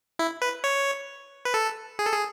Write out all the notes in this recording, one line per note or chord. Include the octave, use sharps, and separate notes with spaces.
E4
B4
C#5
B4
A4
G#4
A4
G#4